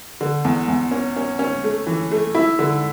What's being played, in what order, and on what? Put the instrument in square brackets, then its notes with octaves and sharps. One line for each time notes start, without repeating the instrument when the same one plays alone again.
[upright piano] D3
E2
E2
C#4
C#4
C#4
A3
E3
A3
E4
D3